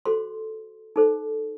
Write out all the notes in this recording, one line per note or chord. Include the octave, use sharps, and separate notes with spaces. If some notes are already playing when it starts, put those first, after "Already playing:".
F#4 A4 C5 C6
D#4 A4 C5